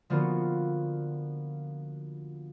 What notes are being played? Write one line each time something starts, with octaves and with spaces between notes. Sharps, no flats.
D3 F3 A#3 B3 F4 F#4